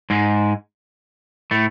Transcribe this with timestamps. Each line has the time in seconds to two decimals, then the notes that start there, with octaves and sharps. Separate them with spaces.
0.10 G#2 G#3
1.51 A2 A3